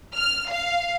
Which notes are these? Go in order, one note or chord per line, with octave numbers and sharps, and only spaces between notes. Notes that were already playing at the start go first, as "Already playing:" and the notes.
F6
F5